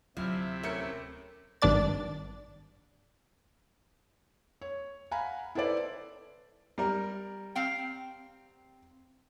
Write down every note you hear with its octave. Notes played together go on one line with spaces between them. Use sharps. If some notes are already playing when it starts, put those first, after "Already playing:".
D1 C3 F3 F#3 E4
A3 C#4 A#4 C#7
G#1 G2 D4 D5 A6
C#5
F5 F#5 G#5 A#5 B5
E4 A4 B4 C5 D5
G3 A#4
C4 F5 G5